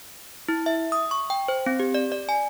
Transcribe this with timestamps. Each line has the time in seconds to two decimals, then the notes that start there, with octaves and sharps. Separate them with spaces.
0.49 E4
0.66 E5
0.92 D#6
1.11 C#6
1.30 G5
1.48 C5
1.66 C4
1.80 G4
1.94 D5
2.12 D5
2.29 G#5